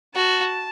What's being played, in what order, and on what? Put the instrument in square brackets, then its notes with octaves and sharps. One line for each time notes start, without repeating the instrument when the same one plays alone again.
[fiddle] F#4 [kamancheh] A5